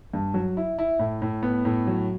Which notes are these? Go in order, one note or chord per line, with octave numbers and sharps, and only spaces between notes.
G2
F#3
E4
E4
A2
A2
B3
A2
F#3